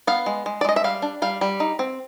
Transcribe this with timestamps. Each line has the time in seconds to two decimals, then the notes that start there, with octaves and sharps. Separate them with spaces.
0.07 B3 F5
0.26 G#3
0.46 G#3
0.61 D5
0.65 G#3 D#5
0.76 E5
0.84 G3 F5
1.02 D4
1.22 G3 F5
1.41 G3
1.60 D#4
1.79 C4